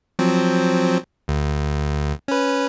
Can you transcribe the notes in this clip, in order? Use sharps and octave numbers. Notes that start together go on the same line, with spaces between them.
F3 F#3 C4
D2
C#4 B4